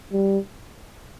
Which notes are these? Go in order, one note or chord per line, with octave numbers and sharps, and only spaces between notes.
G3